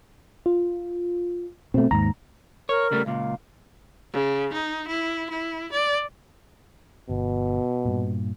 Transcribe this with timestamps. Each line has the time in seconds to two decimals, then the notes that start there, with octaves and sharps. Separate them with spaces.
0.46 F4
1.74 B2 A3 C4
1.91 D#2 G#2 A#5
2.69 A#4 C#5
2.91 C#3 G3 A3
3.06 C#2 A#2 F5
4.12 C#3
4.52 D#4
4.87 E4
5.28 E4
5.70 D5
7.09 G1 B2
7.85 G2 A#2